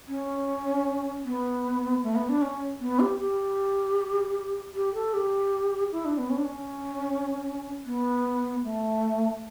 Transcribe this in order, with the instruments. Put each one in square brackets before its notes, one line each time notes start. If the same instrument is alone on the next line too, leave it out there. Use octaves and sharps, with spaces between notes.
[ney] C#4
B3
A3
B3
D4
C#4
B3
G4
G4
G4
A4
G4
E4
D4
B3
C#4
D4
C#4
B3
A3